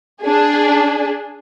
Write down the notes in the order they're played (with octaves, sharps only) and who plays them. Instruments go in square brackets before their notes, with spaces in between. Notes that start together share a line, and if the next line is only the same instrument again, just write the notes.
[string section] D4 G#4